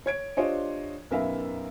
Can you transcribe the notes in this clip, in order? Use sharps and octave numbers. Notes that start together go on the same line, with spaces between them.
C#5 G#6 D7
D4 F4 G4 C5 C#5 D#5
B1 F#2 A#4 B4 E5 F5